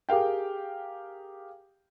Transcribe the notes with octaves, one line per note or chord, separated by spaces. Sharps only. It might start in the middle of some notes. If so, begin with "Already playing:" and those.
G4 G#4 A#4 F5 G5